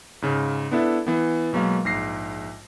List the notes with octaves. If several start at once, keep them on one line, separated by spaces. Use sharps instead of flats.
G#2 C#3
B3 D4 E4 A4 E5
E3 B3
B2 F#3 G#3 A#3 F5
A#1 G#2 A#6 C7